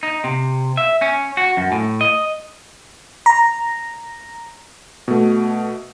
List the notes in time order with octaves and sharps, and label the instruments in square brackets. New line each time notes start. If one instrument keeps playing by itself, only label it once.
[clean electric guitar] D#4
C3
E5
C#4
F#4
F#2
A2
D#5
[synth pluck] A#5
[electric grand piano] B2 A3